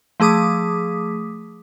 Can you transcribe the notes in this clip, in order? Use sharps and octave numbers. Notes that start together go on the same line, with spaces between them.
F3 A3 G#4 D6 D#6 B6